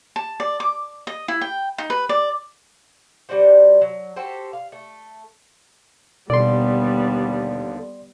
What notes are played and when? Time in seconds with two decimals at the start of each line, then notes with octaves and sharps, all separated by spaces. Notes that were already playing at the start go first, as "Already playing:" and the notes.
0.16 A5
0.40 D5
0.60 D6
1.07 D#5
1.28 E4
1.41 G5
1.78 D#4
1.90 B4
2.09 D5
3.29 G3 D4 F#4 C5
3.81 F#3
4.16 F#4 G4 A4 C5
4.53 F5
4.72 A3
6.30 D#2 B2 D3 G3 B3 D5 C6